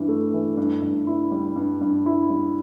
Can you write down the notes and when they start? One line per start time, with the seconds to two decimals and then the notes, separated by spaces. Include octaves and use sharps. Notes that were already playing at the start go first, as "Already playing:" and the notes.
Already playing: G2 E3 E4
0.08 A3
0.34 E3
0.57 G2
0.82 G2
1.07 E4
1.31 G3
1.56 G2
1.81 G2
2.06 E4
2.30 G3